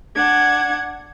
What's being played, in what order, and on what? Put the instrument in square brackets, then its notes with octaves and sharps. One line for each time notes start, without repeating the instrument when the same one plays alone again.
[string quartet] D4 F#5 G#6